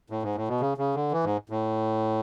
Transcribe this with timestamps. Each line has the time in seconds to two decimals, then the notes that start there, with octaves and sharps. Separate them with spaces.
0.10 A2
0.23 G#2
0.35 A2
0.48 B2
0.61 C#3
0.78 C#3
0.95 D3
1.12 E3
1.24 G#2
1.50 A2